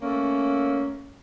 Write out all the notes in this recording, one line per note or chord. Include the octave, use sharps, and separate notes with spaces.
A3 A#3 C#4